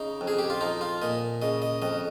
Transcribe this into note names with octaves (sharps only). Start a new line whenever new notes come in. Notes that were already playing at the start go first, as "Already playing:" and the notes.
Already playing: C#3 D#4
F2
G#4
G4
F4
F3 D#4
F4
A#2 D#5
C#3 D#5
D#5
F2 D#5